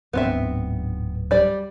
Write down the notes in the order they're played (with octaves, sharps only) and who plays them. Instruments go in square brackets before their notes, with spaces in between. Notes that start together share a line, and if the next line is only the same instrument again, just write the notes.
[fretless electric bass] D1 G#2 D4 [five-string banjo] B3 C4 E5
[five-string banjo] G3 D5